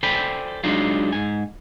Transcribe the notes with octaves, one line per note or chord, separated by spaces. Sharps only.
A4 C5 D5 G5 G#5 B5
F#3 G#3 D4 D#4 F4
G#2 G#5